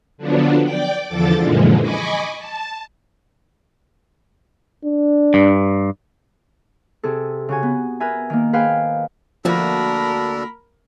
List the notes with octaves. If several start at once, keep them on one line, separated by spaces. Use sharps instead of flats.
D3 F3 F#3 B3 D4
D5 G5 D6
E2 D3 F3 A4 D6 A6
F#2 A#2 D3 E3 F3 G#3
D#5 G#5 B5 C#6 D6
A5
D4
G2
C3 G#4 A4
C#3 F#4 G#5
B3
A#4 B4 E5 G#5
D#3 A#3
G#4 B4 C5 F5 G5 G#5
D2 F3 A#3 D4 F#4 A4 A#4 B5